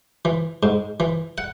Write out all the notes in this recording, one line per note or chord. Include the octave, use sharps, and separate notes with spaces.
E3
G#2
E3
F#5